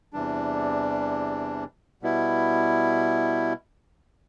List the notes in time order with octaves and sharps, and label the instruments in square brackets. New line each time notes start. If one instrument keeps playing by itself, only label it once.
[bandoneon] E2 C3 E3 G3 D4
B2 G3 B3 E4